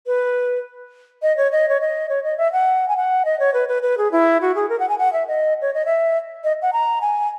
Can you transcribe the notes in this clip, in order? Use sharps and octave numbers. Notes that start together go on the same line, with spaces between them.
B4
D#5
C#5
D#5
C#5
D#5
C#5
D#5
E5
F#5
G#5
F#5
D#5
C#5
B4
B4
B4
G#4
E4
F#4
G#4
A#4
F#5
G#5
F#5
E5
D#5
C#5
D#5
E5
D#5
F#5
A#5
G#5